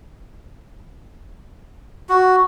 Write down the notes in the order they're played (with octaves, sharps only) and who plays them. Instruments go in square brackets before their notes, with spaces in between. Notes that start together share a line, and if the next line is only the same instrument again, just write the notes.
[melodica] F#4